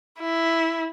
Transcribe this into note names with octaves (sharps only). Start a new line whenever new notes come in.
E4